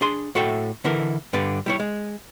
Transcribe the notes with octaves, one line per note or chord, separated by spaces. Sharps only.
D4 G#4 C6
A2 F#4 A4 E5 G5
D3 E3 E4 A4 A#4
G2 D3 B4 D5
G3 E4 C#5
G#3